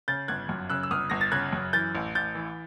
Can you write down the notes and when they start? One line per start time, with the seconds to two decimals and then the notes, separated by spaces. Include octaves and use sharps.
0.08 C#3 G6 A6
0.28 G1 F#6 G#6
0.49 F#2
0.70 C#3 E6 F#6
0.83 E6
0.91 G1 D#6 F6
1.10 G1 A#6
1.21 A6
1.32 C#3 F#6 G#6
1.53 F#2
1.73 E3 G6 A6
1.95 A1
2.15 A1 G6 A6
2.35 E3